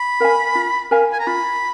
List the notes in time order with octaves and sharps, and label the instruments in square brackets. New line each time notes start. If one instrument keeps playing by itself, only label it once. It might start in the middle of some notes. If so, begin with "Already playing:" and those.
Already playing: [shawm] B5
[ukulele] A#4 F5 G#5
F4
A#4 F5 G#5
[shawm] G#5
A#5
[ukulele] F4 [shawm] B5